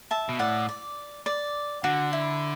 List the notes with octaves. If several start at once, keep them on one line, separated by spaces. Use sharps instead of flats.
E5 A5
B2
A2 D5 F#5
D5
D5
D3 F#4
E4